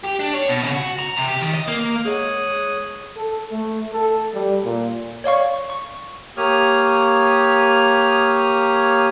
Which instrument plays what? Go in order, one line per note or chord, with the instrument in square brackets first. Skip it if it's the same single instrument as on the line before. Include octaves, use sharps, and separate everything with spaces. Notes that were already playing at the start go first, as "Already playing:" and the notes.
[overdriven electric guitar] G4
D4
C#5
B2
C#3
F#4
A#5
C3
G4
D#3
D#5
A#3
[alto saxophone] G#3 [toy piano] G#4 D#5 F#5 [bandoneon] C#5 F#6 [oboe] D#6
[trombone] A4
A3
A4
G3
A#2
[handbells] C#5 D5 F5 C#6
C#6
[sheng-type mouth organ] A#3 G4 C#5 D#6 F6